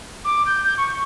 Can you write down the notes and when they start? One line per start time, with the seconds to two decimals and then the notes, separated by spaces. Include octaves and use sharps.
0.25 D6
0.46 G6
0.64 G6
0.78 C#6